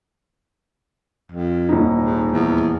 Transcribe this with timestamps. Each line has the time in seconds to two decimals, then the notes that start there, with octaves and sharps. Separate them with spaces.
1.32 F2
1.69 D#1 D#4
2.02 G#2
2.32 E2